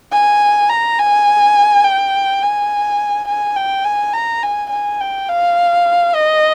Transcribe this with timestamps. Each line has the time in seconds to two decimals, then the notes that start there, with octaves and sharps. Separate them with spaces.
0.12 G#5
0.70 A#5
0.99 G#5
1.84 G5
2.42 G#5
3.28 G#5
3.56 G5
3.85 G#5
4.13 A#5
4.43 G#5
4.71 G#5
5.00 G5
5.29 F5
6.14 D#5